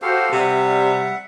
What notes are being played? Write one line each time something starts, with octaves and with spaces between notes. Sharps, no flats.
F#4 G4 A4 C5 F5
C3 G3 E5 F#5